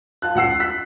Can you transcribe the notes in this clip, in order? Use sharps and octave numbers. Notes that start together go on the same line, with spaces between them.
F4 A5 F#6
C#2 F#5 E6 C7
E6 F#6 B6